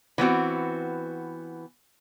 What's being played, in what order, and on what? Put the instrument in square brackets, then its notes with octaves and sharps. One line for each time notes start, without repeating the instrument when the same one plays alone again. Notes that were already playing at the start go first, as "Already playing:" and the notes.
[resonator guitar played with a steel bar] E3 B3 C4 F#4